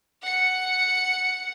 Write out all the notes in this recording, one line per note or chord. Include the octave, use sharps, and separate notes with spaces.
F#5 C#7